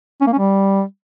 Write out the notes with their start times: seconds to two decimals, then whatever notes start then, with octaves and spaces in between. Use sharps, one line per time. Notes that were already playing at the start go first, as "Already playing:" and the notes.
0.21 C#4
0.27 A#3
0.33 C#4
0.38 G3